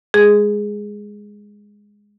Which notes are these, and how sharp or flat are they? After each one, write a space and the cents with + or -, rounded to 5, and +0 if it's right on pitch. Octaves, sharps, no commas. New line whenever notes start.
G#3 -10 G#4 +0